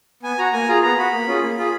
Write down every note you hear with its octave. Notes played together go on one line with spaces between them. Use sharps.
B3 G#5
F#4 A#5
A#3 G#5
F4 G#4 A#5
B3 A#5
F#4 B5
A#3
C#4 F4 G#4
A#3
F4 G#4